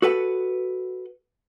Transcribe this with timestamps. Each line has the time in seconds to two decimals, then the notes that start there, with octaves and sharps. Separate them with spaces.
0.02 F#4 A4 B4 F#5